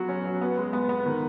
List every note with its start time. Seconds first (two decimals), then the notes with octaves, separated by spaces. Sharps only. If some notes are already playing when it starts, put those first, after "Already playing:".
Already playing: F#3 B3 F#4
0.09 C#4
0.25 F#3
0.41 B3
0.58 G#3
0.73 B3
0.89 B3
1.06 D#3